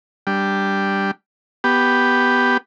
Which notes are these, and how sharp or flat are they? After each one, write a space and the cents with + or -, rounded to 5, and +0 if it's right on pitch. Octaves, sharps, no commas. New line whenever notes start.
G3 +0 D4 +0
B3 +0 G4 +0